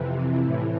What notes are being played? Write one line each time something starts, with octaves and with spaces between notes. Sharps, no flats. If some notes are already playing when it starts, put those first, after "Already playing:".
Already playing: F2 C3 E3
A2 E3